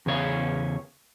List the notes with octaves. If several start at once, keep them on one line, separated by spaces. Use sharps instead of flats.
E2 C#3 C#5 F5